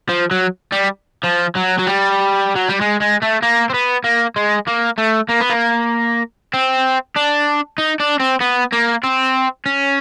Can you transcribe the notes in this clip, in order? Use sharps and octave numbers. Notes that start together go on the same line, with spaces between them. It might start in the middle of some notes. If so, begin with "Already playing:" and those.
F3
F#3
G3
F3
F#3
F#3
G3
F#3
G3
G#3
G#3
A3
A#3
C4
B3
A#3
G#3
A#3
A3
A#3
B3
A#3
C4
D4
D#4
D4
C4
B3
A#3
C4
C#4